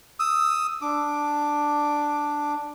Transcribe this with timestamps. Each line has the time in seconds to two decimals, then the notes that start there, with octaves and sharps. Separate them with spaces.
0.20 D#6 E6
0.82 D4 D6